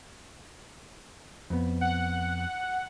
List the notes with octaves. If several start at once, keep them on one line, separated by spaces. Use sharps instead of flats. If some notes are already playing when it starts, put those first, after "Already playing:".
F2 B3
F#5